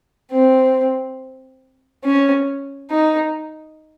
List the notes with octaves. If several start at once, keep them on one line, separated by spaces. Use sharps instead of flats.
C4
C#4
D#4